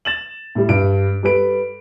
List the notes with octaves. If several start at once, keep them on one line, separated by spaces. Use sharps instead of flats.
A6 E7 F#7
A2 G3
G2 D7
G3 A4 B4 D7